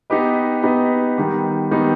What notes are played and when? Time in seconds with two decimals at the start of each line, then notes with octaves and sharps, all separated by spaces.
0.10 B3 D#4 G4 B4 D#5
0.63 B3 D#4 G4 B4 D#5
1.18 D#3 G3 B3 D#4
1.71 D#3 G3 B3 D#4